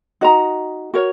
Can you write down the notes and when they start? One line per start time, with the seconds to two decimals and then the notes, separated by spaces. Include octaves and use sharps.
0.21 D#4 F#4 D#5 A#5
0.94 F#4 A#4 C#5